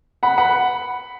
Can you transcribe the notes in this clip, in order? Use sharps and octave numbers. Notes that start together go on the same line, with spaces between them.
F#5 B5
F#5 B5